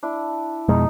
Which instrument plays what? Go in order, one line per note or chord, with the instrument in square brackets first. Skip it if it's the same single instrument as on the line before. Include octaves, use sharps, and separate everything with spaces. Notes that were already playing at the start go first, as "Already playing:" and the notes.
[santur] D4 E4
[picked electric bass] F2 B2 G#3 [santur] D#4